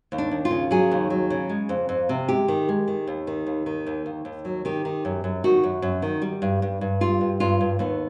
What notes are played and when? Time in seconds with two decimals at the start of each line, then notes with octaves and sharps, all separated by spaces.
0.12 D#2
0.18 D4
0.31 D#2
0.45 F4
0.51 C#3
0.71 F#3 G#4
0.91 D#2
1.10 F#3
1.30 C#3
1.49 G#3
1.69 F2
1.89 F2
2.09 C3
2.29 G#3 G4
2.48 D#3
2.69 G#3
2.88 D#3
3.07 D#2
3.27 D#3
3.47 D#2
3.66 D#3
3.87 D#2
4.06 D#2
4.25 D#2
4.45 F#3
4.65 D#3 G4
4.85 D#3
5.05 F#2
5.24 F#2
5.44 D#3 F#4
5.64 F#2
5.82 F#2
6.02 D#3
6.22 G3
6.42 G2
6.62 G2
6.81 G2
7.01 G3 F4
7.21 G2
7.40 G2 F4
7.61 G2
7.79 D#2 B3